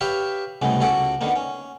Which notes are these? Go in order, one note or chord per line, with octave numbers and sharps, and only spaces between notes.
G4 B4 C#5 E5 F5
C2 A2 C#3 G#3 B3
C#2 C#4 F#4 A4 F#5 D6
D3 D#3 A#3 B3
C#4